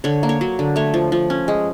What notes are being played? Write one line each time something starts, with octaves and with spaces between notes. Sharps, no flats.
D3 C#5
A#3
C#5
F#3
D3
A3 C#5
F3
F3
C#4
G#3